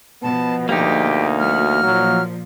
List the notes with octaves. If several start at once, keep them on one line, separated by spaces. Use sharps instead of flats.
B2 F3 B3 A5
D2 A#3 D#4 G4
F3 A3 F#4 F6
A#2 F3 F#3